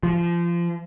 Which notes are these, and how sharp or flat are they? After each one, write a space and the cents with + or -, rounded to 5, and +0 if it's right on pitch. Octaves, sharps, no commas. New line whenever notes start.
F3 -25